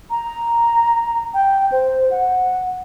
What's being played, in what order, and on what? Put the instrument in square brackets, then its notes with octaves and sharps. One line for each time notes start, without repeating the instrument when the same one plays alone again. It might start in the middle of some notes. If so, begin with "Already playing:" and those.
[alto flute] A#5
G5
C5
F#5